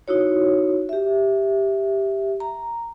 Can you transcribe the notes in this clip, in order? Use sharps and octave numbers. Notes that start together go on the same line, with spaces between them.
D#4 E4 F#4 C#5
G4 E5
A#5